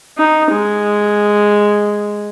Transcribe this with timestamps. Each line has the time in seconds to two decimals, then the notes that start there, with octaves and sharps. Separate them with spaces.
0.18 D#4
0.52 G#3